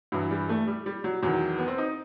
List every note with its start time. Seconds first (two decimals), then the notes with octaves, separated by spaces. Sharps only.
0.12 G2 E3 F#3
0.31 G3
0.49 A3
0.68 G3
0.86 G3
1.04 F#3
1.23 E2 D#3 F#3
1.58 B3
1.68 C4
1.78 D#4